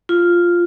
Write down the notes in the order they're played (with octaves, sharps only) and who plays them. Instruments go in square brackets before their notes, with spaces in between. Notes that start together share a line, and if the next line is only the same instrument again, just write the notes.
[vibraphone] F4